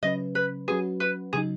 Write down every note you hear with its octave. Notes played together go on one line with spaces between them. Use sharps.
C#3 F#3 C#4 B4 D#5
B4
F#3 C#4 F#4 G#4 B4
B4
C#3 F#3 D#4 G#4